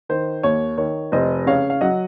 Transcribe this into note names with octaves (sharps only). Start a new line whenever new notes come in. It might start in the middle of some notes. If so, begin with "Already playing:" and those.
D#3 C5
D#2 C#5
D#3 C#5
F1 C5 D#5
C#3 C#5 F5
F5
F#3 D#5 F#5